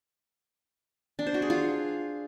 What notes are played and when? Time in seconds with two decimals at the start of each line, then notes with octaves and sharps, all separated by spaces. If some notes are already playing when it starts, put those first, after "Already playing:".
1.19 D4
1.27 C5
1.34 F#4
1.42 G#4
1.50 F4